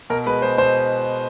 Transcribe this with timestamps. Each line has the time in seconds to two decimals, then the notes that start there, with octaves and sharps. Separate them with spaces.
0.10 B2 A#4
0.26 G#3 B4
0.42 G#3 C5
0.58 B2 C5